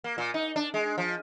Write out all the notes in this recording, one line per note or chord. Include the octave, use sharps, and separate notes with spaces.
A#3
A#2
D#4
D4
G#3
F3